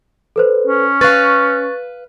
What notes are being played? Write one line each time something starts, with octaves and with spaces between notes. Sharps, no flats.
A4 B4 C5
C#4
B4 F5 C#6 F#6 A6